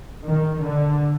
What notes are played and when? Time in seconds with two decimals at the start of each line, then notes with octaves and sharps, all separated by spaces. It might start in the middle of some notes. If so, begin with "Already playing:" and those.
0.25 D#3
0.61 D3